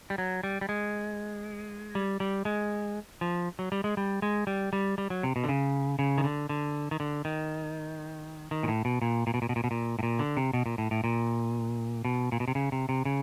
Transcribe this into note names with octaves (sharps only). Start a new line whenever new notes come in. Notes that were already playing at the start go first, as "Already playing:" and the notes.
G3
F#3
G3
G3
G#3
G3
G3
G#3
F3
F#3
G3
G#3
G3
G#3
G3
G3
G3
F#3
C3
B2
D3
C#3
C#3
D#3
D3
D3
D#3
D3
D#3
D#3
A#2
A2
B2
A#2
A#2
B2
A#2
B2
A#2
B2
A#2
A2
A#2
D3
C3
B2
A#2
A2
A2
A#2
B2
A#2
B2
C3
C#3
C3
C3
C#3